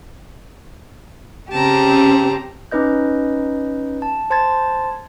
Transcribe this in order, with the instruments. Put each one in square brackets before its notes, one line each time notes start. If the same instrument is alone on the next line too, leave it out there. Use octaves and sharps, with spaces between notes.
[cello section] C#3 C4 C#4 [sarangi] G4 [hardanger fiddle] A5 A#5
[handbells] C#4 D#4 B4 D#5 G6
A5
C5 A5 C6 G#6 A6